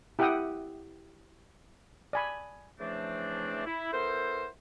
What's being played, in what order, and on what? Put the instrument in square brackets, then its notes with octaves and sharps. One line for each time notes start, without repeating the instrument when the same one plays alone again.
[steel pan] E4 G4 E5 F#5 G5 D#6
D5 G#5 B5
[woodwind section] C#3 E3 F3 A3 C4 D4
E4
B3 E4 A4 A#4 C5